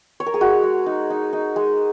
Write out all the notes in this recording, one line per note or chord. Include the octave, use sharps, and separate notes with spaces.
C#5
A#4
G#4
G#3 F#4
G#3
D#4
D#4
D#4
G#3